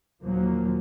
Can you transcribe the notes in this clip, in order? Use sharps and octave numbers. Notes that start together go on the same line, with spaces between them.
D#2 A#2 F3 F#3 A#3